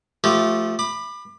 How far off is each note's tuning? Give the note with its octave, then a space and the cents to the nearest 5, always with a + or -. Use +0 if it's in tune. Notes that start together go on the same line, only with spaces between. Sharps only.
F3 +0 A3 +0 G4 -25
B5 +0 D6 +30